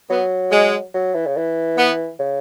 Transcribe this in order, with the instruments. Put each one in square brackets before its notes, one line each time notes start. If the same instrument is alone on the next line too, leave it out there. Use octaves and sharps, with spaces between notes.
[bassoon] F#3 [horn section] B3
[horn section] G#3
[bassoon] F#3
E3
C#3
E3
[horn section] B3
[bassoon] C#3